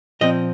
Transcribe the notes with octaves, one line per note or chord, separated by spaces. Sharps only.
A#2 F3 C4 D#5